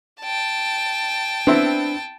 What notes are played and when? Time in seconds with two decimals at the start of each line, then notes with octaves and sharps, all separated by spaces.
0.21 G5 A5
1.47 B3 C4 D4 E4